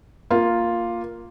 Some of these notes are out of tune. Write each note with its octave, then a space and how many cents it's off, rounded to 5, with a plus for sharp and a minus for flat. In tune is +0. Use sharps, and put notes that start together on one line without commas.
A#3 +0 F4 +0